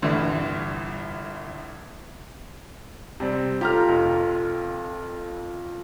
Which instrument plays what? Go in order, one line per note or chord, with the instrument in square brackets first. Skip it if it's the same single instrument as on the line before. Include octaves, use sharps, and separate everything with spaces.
[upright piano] G1 C2 G2 D3 E3
[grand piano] C3 G3 C4
[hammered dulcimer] F4 A4 G5 [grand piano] G4 A#5 F6
[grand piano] F1 F2